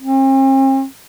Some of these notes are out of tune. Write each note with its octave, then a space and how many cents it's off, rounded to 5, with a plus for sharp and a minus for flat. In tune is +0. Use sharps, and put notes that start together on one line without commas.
C4 +45